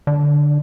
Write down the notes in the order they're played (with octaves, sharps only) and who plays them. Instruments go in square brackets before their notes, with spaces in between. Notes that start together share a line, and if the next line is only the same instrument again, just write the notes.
[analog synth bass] D3